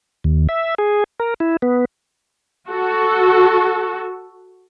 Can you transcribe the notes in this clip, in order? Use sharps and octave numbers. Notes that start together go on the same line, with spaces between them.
D#2
E5
G#4
A#4
E4
B3
F#4 A4